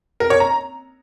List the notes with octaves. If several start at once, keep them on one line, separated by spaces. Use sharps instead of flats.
A#4
C#5
A#5